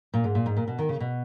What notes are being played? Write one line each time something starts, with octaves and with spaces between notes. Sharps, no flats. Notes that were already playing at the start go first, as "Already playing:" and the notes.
A#2
G#2
A#2
G#2
A#2
B2
D#3
C#3
B2